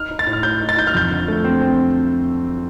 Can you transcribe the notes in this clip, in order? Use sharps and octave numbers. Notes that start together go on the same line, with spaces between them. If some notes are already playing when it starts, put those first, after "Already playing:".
Already playing: D#4 F6
D#4
A6
A2
F6
A2 G6
D#4
A6
D#4 G6
F6
F2 G6
D3
A3
C4
C4